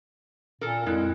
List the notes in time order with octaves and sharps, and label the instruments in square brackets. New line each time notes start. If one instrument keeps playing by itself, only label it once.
[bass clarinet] A#2 [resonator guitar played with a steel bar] A4 A#4
[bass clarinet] F2 [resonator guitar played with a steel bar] G#3 E4